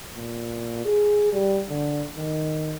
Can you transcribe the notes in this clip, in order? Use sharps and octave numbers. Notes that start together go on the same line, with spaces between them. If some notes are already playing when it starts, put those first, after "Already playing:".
A#2
G#4
G3
D3
D#3